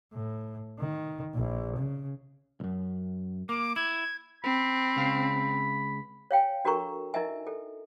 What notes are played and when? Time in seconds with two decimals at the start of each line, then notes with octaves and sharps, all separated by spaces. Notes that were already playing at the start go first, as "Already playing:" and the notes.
0.13 A2
0.78 D#3
1.34 A#1
1.76 C#3
2.60 C2 F#2
3.49 A#3 D6
3.76 E4 G#6
4.44 C4 B5
4.96 C#2 C#3 F5
6.31 C#5 F5 G5 G#5
6.65 D4 F#4 A4 A#4 A#5 C#6
7.14 D#4 E4 A#4 D#5 E5 G#5
7.47 A4